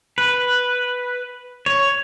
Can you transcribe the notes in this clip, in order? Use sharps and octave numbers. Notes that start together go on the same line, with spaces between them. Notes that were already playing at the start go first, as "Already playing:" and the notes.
B4
C#5